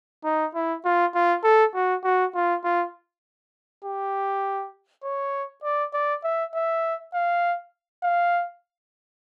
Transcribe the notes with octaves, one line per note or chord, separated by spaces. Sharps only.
D#4
E4
F4
F4
A4
F#4
F#4
F4
F4
G4
C#5
D5
D5
E5
E5
F5
F5